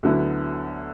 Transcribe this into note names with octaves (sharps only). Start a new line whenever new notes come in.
D2 D3 F#3 B3 E4